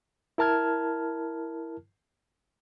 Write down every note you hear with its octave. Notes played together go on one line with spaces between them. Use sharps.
E4 A#4 A5 F6 G#6